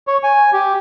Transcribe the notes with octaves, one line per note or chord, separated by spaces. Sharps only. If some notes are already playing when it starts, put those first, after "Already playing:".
C#5
G#5
G4